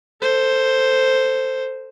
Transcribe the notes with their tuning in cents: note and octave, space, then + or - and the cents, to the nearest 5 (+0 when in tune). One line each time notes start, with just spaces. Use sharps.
A4 +20 C5 +0